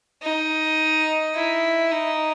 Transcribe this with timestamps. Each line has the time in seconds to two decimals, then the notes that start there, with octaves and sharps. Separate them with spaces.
0.22 D#4
1.35 E4
1.92 D#4